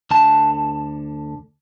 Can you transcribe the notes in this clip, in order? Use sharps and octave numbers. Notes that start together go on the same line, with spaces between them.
D2 D3 A5